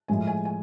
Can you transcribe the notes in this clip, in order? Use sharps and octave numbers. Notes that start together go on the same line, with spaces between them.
A2 F3 G#3 G#5
G#5
G#5